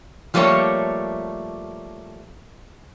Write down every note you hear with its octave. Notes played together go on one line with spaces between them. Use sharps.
F3 G3 A3 A#3 C#5